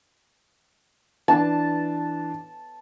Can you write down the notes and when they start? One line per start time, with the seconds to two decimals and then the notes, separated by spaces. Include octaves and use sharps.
1.28 E3 D4 A5